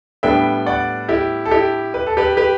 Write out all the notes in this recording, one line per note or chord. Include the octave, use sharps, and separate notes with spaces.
A2 G3 B3 D4 E5 G5
D5 F#5
E4 G4
A4
E4 G4
B4
A4
G4 B4
G4 B4